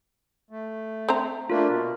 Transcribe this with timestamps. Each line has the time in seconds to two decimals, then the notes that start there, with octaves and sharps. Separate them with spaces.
0.51 A3
1.09 C4 C5 A#5
1.50 A3 A#3 D4 F4 A#4
1.69 B2